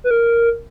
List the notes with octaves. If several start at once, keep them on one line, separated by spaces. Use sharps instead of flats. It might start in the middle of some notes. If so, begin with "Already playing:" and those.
B4
A#4